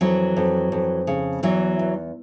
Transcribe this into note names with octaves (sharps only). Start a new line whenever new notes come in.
F2 E3 F#3
F2
F2
C#3
E2 E3 F#3
E2